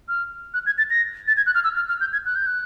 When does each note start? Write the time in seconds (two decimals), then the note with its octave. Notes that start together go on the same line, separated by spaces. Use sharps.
0.08 F6
0.54 F#6
0.66 G#6
0.78 A6
0.90 A#6
1.28 A6
1.37 G#6
1.46 F#6
1.55 F6
1.64 E6
1.76 F6
1.89 F6
2.01 G6
2.13 G#6
2.26 F#6
2.36 G6
2.46 F#6